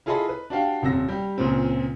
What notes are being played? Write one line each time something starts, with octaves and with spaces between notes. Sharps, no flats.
E4 F4 G#4 A4 D#5 B5
B4
D4 F#4 G4 F5 G5
D#1 C3 E6 A#6
G3 G4
C#2 A#2 C4